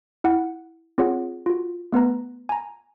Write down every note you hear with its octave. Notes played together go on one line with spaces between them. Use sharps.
E4 F#5 G5
C4 F4 G#4 C#5 F#5
F4 F#4
A3 B3 B4 A#5
G#5 A#5